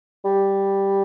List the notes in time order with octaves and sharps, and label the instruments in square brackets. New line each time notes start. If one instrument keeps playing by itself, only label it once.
[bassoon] G3